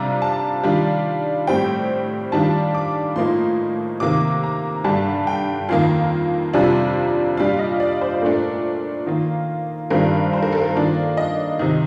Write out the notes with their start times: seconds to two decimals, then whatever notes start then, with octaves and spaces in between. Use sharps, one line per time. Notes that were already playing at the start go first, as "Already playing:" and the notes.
Already playing: C3 G3 D4 F4 A#5
0.22 A5
0.63 D#3 G3 D4 F4
1.47 A2 G3 C4 G5
2.32 D#3 G3 D4 F4 A5
2.75 D6
3.16 A2 F3 A#3 D#4 C6
4.00 C3 D#3 A#3 D6
4.43 A#5
4.84 G2 D3 G3 A5
5.27 G5
5.69 F2 D#3 A#3 F5
6.53 F2 C3 G3 D4 F4
7.37 A#2 G3 D4 F4 F5
7.59 D#5
7.80 D5
8.01 C5
8.22 A#2 A3 D4 A#4
9.06 D#3 A#3 F4
9.90 G2 D#3 G3 C4 F4 A#4
10.33 C5
10.42 A#4
10.53 A4
10.62 A#4
10.75 D#3 A#3 D4 F4
11.17 D#5
11.59 C3 D#3